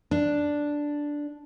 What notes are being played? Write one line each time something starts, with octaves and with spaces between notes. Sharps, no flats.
D4